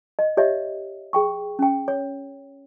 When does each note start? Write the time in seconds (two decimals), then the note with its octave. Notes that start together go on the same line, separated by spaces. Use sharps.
0.19 D#5
0.37 G4 C#5 D#5 E5
1.13 G#4 G5 C#6
1.59 C#4 G5
1.88 C#5